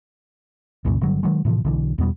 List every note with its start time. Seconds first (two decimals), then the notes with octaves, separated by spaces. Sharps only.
0.85 C2 F#2 A#2 C#3
1.01 G1 D3 F#3 G3
1.23 D#3 F#3 G#3
1.45 A2 C3 E3 F3
1.65 B1 D3 E3
1.98 E2 B2 F#3 G3